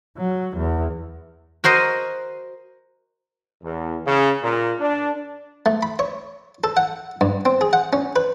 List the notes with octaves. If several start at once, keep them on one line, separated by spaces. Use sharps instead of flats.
F#3
E2
F#4 A#4 C5 D#5
E2
C#3
A#2
D4
A3
B5
C#5
A4
F#5
G2
C4
G#4
F#5
C#4
B4